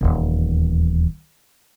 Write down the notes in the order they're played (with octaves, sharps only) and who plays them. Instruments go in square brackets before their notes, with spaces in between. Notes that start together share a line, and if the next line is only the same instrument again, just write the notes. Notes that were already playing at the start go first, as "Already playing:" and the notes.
[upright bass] D#1 E2